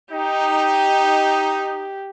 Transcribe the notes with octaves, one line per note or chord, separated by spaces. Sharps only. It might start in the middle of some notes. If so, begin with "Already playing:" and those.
D#4 G4